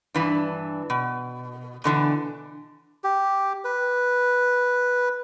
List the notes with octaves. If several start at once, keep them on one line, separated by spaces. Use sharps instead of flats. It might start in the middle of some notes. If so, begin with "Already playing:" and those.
G2 E3 D4
B2
B2 D3 E3 D4
G4
B4